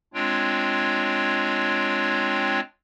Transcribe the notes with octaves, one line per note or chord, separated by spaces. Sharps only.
G#3 C4 D4 F4 C#5 G5